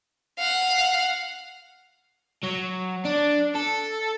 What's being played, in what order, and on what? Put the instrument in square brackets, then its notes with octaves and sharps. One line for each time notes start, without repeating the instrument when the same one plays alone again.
[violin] F5 F#5
[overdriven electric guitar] F#3
D4
A4